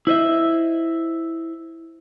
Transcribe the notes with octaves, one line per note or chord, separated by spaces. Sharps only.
E4 C5 D#5 E5